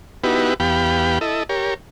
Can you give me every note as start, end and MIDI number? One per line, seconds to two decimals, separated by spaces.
0.24 0.54 59
0.24 0.54 63
0.24 0.54 64
0.24 0.54 66
0.24 0.54 67
0.24 0.54 71
0.60 1.19 40
0.60 1.19 59
0.60 1.19 67
0.60 1.19 77
0.60 1.19 79
0.60 1.19 83
1.21 1.43 64
1.21 1.43 69
1.21 1.43 75
1.49 1.74 67
1.49 1.74 70
1.49 1.74 73